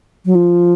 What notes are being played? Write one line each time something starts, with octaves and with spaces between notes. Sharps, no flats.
F#3
F3